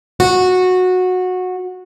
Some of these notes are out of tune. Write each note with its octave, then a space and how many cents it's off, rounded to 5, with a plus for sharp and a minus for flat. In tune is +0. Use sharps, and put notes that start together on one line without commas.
F#4 -15